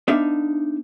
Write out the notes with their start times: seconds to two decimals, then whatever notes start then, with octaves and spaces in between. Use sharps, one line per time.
0.08 B3 D4 D#4 E5 F5